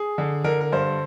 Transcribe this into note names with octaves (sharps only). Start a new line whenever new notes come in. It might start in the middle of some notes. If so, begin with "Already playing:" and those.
Already playing: G#4
D3
D3 A#4
A#4
G2 C5